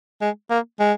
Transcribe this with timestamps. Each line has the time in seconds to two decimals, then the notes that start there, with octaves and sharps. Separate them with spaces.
0.21 G#3
0.50 A#3
0.80 G#3